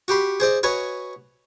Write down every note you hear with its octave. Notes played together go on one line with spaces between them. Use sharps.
F#4 G4 B5 C6
G#4 C5 D5 D#5
F#4 B4 C#5 D#5 G#5